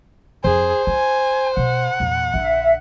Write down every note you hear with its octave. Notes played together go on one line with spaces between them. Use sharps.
F2 G#4 C5
F4 G#5
B2 F#5
E2 A#2
A#1 D3 E5